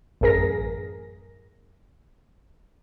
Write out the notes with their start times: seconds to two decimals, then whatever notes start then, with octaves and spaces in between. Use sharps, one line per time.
0.21 A1 F#2 G#4 A#4 A#6